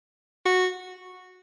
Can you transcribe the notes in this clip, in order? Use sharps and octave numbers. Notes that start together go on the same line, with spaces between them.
F#4